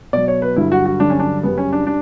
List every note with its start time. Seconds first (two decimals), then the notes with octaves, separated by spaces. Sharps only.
0.13 B2 F#3 D5
0.28 C#5
0.42 B4
0.56 G2 D3 F#3 E4
0.72 F#4
0.86 F#4
1.00 G2 D3 F#3 D4
1.10 C#4
1.19 D4
1.43 F#2 C#3 G3 B3
1.58 C#4
1.73 D4
1.87 G3 D4